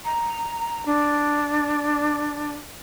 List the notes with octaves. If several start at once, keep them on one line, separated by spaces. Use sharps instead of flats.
A#5
D4